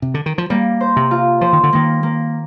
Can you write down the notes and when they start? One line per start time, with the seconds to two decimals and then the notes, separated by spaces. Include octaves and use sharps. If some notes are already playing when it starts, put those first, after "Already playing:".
0.02 C3
0.14 D3
0.26 D#3
0.38 F3
0.50 G3 A#3
0.81 C5
0.96 C3
1.11 F4
1.41 F3 C5
1.53 D#3
1.63 D3
1.73 D#3 A#3
2.03 A#3